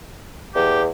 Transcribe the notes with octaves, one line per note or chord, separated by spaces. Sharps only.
E2 G4